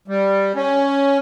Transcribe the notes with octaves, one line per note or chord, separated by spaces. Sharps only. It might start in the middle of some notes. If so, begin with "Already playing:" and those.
G3
C#4